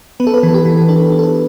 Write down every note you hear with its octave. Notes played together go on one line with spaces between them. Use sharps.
B3 B4
A4
B4
E3
A4
G4
E3
D4 A4
D4
A4
B4